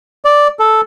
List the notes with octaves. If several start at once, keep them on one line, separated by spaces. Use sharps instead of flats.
D5
A4